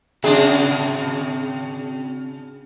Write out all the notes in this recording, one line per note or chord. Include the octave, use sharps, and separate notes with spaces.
C#3 C4 D4 F#4 G#4 E5